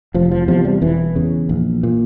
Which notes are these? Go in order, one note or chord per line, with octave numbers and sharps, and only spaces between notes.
F1 F3
F3
E2 C3 F3
G3
E1 E3
E2 C#3
A#1
A#2